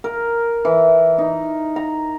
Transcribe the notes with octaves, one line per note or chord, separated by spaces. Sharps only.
A#4
E3
D#4
A#5